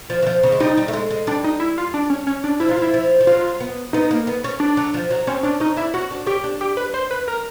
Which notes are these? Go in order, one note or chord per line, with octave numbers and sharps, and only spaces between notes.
F3
E3
F3
C#3
G#3
G3 D#4
G3
A3
G#3
G#3
G3 D4
D#4
E4
F4
D4
C#4
C#4
D4
F3 E4
F#3 F4
F3 E4
F3
F3
F#3 F4
B3
B3 D#4
A#3
B3
C#4
D4
F#3
F3
F#3
C4 C#4
C#4 D4
C#4 D#4
D4 E4
C#4 F#4
D4
C#4 G4
D4
G4
B4
C5
B4
A#4